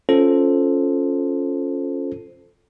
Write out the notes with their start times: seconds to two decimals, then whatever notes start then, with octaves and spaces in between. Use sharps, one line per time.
0.09 C#4 F4 A4 C5